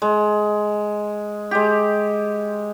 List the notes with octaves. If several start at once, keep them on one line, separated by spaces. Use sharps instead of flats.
G#3
G#3 G4